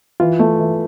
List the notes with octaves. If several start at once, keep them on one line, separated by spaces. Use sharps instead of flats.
E3 F4
A3
E3